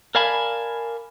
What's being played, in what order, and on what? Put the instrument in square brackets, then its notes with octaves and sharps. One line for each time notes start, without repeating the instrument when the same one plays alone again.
[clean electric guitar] A#4 D5 F5 G#5 A5 B5